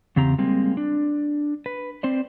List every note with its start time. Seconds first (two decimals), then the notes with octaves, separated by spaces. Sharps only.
0.16 E2 C#3 C4 G4 A#5
0.38 G3 G#3 A#3 C4
0.77 D4
1.66 B4
2.03 C4 C5 D5